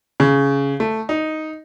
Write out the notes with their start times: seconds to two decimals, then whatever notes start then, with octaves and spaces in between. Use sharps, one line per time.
0.20 C#3
0.80 A3
1.09 D#4